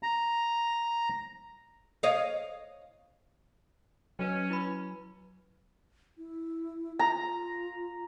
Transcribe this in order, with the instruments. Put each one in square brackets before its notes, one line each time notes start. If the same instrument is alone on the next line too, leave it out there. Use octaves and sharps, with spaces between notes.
[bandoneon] A#5
[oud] C#5 D#5 F5
[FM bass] F#3 [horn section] C#4 [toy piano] B4 D#5
[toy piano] E4 B4 B5
[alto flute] E4
[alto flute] F4 [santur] A#5